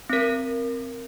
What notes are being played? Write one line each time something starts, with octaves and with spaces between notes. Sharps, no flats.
C4 A#4